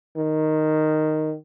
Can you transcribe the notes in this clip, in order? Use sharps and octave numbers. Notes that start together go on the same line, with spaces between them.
D#3